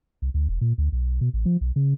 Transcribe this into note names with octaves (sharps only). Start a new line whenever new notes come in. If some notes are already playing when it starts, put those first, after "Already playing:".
C2
D2
E1
A#2
D2
B1
B2
A1
F3
B1
C#3